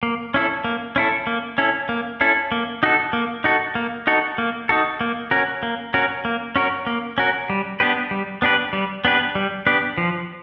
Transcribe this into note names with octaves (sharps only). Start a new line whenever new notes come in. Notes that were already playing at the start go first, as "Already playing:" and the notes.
A#3
C#4 E4 A4
A#3
C#4 E4 A4
A#3
C#4 E4 A4
A#3
C#4 E4 A4
A#3
D#4 F#4 A4
A#3
D#4 F#4 A4
A#3
D#4 F#4 A4
A#3
D#4 F#4 A4
A#3
C#4 F#4 A#4
A#3
C#4 F#4 A#4
A#3
C#4 F#4 A#4
A#3
C#4 F#4 A#4
G3
B3 D4 G4 B4
G3
B3 D4 G4 B4
G3
B3 D4 G4 B4
G3
B3 D4 G4 B4
F3